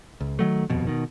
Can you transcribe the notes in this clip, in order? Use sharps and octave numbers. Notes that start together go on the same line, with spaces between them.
C#2
D#3 F#3 A3
D#1 F2 B2
B2 D#3